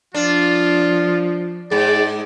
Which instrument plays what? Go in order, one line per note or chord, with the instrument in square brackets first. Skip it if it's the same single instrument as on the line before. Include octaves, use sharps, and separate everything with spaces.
[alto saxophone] F3 [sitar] D4 [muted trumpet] F4
[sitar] G#2 [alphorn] G#4 [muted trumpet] D5